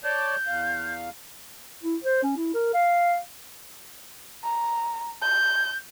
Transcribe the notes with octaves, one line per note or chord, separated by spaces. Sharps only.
C#5 D5 A5 G6
E2 F5
E4
C5
C#4
E4
A#4
F5
A#5
G6